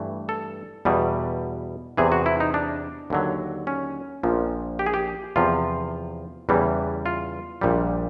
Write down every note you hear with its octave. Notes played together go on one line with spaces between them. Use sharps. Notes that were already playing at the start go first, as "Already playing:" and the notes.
Already playing: G2 E3 A3
A4
E2 B2 G3
E2 C3 E3 G#4
F#4
E4
D#4
D4
D#2 D3 F#3
C#4
A#1 A#2 F3
G4
G#4
G4
E2 C3 F3 F4
E2 C#3 E3 G3
F4
A#1 A#2 G3